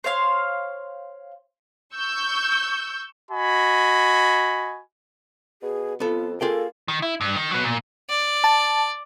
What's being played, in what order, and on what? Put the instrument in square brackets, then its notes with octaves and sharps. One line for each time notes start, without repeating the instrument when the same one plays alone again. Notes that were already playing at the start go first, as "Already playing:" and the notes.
[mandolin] C5 C#5 F5 C6
[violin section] C#6 E6 G6
[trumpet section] F#4 D#5 G#5 B5
[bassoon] B2 [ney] G#4
[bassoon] F2 [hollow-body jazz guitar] B3 A4 [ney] F4
[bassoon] A#3 [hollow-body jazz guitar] F4 G#4 G5 [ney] A4
[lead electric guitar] D#3
E4
G2
D#3
F#3 B3
A#2
[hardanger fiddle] D5
[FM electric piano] A5